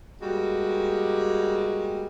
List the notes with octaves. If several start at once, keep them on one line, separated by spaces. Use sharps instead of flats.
G3 G#3 A#3 F#4